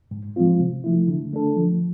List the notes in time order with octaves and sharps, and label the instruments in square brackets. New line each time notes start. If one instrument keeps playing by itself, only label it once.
[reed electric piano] G#2
F3 G#3 C4 F4
C3
F3 A3 E4
D3
A3 D4 A4
F3